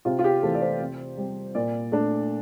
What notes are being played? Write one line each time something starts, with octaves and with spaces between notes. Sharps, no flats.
C3 F4
F4
G4
E3 A3 C4 A4
D5
C5
C3
G3 C4
A#2 D5
A3 D4